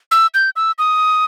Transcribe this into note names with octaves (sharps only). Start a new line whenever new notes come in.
E6
G6
E6
D#6